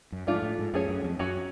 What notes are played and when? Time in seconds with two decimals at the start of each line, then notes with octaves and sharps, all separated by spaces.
0.12 F#2
0.27 G#2 F3 A3 D4 F4
0.42 A2
0.59 G#2
0.74 F#2 A3 C#4 G#4 C#5
0.89 F#2
1.04 F2
1.19 F#2 F#3 C#4 F#4